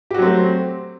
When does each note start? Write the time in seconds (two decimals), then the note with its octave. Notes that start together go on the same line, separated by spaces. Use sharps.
0.11 G4
0.14 F#4
0.18 F#3
0.22 C4
0.26 A3